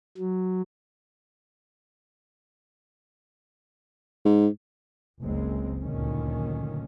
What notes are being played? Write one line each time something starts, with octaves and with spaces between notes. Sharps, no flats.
F#3
G#2
F#1 C#2 G#3 C4
F#1 D2 A#2 D3 D#3 C#4